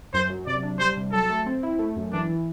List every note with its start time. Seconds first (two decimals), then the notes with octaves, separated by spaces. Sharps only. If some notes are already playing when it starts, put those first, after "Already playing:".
0.14 F#2 C5
0.30 F#3
0.47 C3 D5
0.63 D4
0.80 G3 C5
0.97 C3
1.13 F#3 A4
1.29 A3
1.46 C4
1.63 E4
1.79 A3
1.96 F#2
2.13 E3 D4
2.30 E3